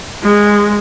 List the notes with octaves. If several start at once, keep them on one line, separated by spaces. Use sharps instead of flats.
G#3